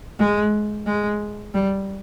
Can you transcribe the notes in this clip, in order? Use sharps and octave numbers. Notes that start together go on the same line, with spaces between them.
G#3
G#3
G3